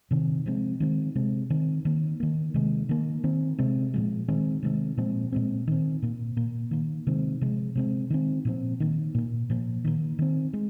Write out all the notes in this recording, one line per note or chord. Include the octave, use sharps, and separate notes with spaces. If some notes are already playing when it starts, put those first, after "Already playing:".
C3 D#3 C4
C3 F3 G#3 C4
D#3 G#3 C4
C3 G#3 C4
D#3 C4
D#3 A#3
D#3 A#3
C3 D#3 G#3
D#3 A#3
D#3 C4
C3 G#3 C4
A#2 F3 G#3
D#3 G#3 C4
C3 D#3 G#3 C4
A#2 F3 G#3 C4
A#2 G#3 C4
D#3 C4
A#2 A#3
A#2 A#3
D#3 A#3
C3 D#3 G#3 C4
C3 F3 G#3
C3 G#3 C4
D#3 G#3 C4
A#2 F3 C4
D#3 A#3
A#2 A#3
A#2 F3 A#3
D#3 A#3
D#3 C4
G#3